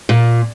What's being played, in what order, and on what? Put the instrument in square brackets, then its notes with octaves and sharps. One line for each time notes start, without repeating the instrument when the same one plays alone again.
[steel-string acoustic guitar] A#2